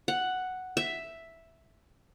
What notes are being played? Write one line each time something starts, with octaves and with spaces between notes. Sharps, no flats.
F#5
E5